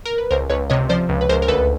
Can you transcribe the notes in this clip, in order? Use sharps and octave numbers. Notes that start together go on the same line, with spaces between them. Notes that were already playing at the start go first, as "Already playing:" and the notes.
A#4
B4
C#2 A#4 C5
C#2 B4 C#5
C3 C#5 D#5
F3 C5 D5
C#2
B4
C#2 A#4 C5
A#4
D2 A4 B4